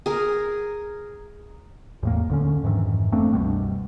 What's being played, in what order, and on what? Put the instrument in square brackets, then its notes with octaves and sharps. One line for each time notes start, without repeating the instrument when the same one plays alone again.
[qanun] G#4 A#4
[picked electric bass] E2 A2 A#3
D2 D3 C#4
F2 G#2 D#3 E3
A3 A#3 C4 D4
C2 F#2 B2 G3